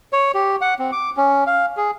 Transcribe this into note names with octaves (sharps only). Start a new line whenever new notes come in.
C#5
G4
F#5
C4
D6
C#4
F5
G#4